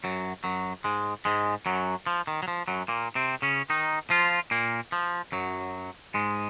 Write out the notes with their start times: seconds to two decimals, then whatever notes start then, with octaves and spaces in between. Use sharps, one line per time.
0.04 F#2 F#3
0.44 F#2 F#3
0.84 G#2 G#3
1.25 G#2 G#3
1.66 F#2 F#3
2.07 F3
2.27 D#3
2.43 F#3
2.48 F3
2.68 F#2 F#3
2.88 A#2 A#3
3.15 C3 C4
3.42 C#3 C#4
3.70 D#3 D#4
4.10 F3 F4
4.51 A#2 A#3
4.92 F3
5.32 F#2 F#3
6.14 G#2 G#3